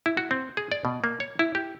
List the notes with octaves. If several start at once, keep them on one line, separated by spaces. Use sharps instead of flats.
E4
F#4
C4
G#4
D5
B2
A#3
C#5
E4
G4